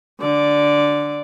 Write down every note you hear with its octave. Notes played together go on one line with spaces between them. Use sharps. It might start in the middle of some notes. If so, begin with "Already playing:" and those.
D3 D5